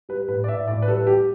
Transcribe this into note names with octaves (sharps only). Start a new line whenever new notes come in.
G3 B4
A2 B4
D5
A2 E5
A2 D5
B4
G3 A4
G3 G4